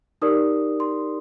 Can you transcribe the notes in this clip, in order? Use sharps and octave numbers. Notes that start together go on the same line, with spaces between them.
D#4 G4 A#4 D5 D#6
C6